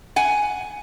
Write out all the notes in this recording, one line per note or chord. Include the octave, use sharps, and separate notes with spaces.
F#5 G#5